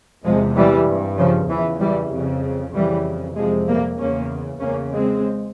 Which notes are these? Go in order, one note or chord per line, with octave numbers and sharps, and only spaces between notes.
E2 C3 F3 G#3
E3 G3
G2
C#3 F3
E2 C#3 E3
E3 G3
F2 C#3
F2 C#3 E3 G3
F2 C3 F3 G#3
G3 A#3
E2 C#3 A#3 C#4
E2 C#3 A#3 C#4
G#3 C4